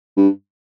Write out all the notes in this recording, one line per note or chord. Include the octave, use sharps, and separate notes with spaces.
G2